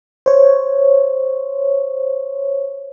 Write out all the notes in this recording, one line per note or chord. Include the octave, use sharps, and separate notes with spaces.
C5 C#5